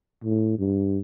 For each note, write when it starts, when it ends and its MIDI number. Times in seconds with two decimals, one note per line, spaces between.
0.24 0.54 45
0.59 0.99 43